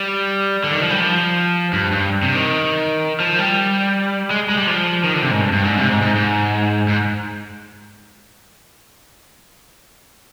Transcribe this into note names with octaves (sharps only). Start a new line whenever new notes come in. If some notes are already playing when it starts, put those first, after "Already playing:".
Already playing: G3
D3
D#3
F3
G3
F3
G2
G2
C3
D#3
F3
G3
G#3
G#3
G3
F3
D#3
D3
C3
G#2
G2
G2
G#2
C3
G#2
G#2
G#2
G#2